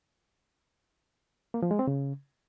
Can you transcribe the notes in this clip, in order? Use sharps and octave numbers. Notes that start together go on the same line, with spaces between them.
A#3
F3
G#3
C4
C#3